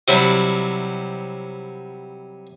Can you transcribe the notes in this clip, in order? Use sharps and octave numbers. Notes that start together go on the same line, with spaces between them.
C3 F#3 G3 E4